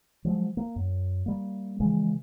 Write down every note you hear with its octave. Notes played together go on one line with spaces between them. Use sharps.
F3 F#3 G#3
A#3
F#2
G3 A#3
C#3 E3 F3 G#3